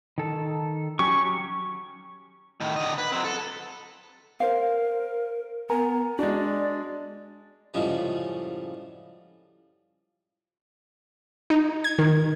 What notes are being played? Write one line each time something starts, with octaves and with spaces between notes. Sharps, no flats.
D#3 A4
F#3 C#4 G4 C#6
A2 D#3
D3 D#5
B4
F#3 C4
A4
A#4 C5 F5
B3 A#4 G#5 A#5
G#3 D4 F#4 D5
F#2 A2 C#3 F3 G3 G#3
D#4
G#6
D#3